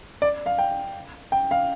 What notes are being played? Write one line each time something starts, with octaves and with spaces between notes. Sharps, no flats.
D5
F5
G5
G5
F5